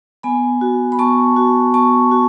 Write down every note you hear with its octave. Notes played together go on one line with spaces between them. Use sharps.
B3 G#5 B5
F#4
B5
B3 A5 C#6
F#4
B3 A5 C#6
F#4